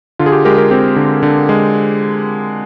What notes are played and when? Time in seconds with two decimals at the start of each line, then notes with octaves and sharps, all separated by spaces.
0.19 D3 F4
0.26 G#4
0.32 G4
0.45 G#3 G4 A#4
0.58 G4 A#4
0.71 C4 G4
0.96 D3
1.23 D3
1.49 G#3